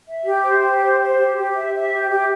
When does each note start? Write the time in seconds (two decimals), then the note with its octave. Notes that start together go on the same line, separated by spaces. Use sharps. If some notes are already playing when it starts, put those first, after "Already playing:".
0.07 E5
0.26 G4
0.44 C5
0.63 G4
0.81 C5
1.00 C5
1.18 G4
1.36 G4
1.55 E5
1.73 E5
1.92 G4
2.10 G4